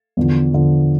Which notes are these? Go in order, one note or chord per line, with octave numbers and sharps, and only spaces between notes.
E2 D3 F3
E2 D3 F3